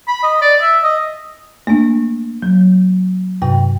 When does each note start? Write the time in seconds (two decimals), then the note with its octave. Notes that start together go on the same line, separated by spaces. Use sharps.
0.07 B5
0.23 D#5
0.42 D5
0.62 E5
0.83 D#5
1.67 A3 A#3 D4
2.42 F#3
3.42 G2 C3 G5